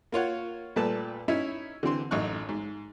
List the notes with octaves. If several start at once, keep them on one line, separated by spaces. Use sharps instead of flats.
A#3 F4 C#5 F#5
A#2 G3 A3 B4 A5
C#4 D#4 E4 E5
D3 E3 C4 C6
A1 F#2 D#4 C#6 F#6
G#2